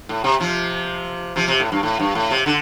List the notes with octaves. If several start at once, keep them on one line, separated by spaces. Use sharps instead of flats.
A2
C3
C3 F3
C3 F3
C3
A2
G2
A2
G2
A2
C3
D3